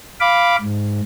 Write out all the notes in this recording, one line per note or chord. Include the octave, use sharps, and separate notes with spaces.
F5 B5 D6
G#2